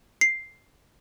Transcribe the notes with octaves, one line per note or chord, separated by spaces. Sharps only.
C7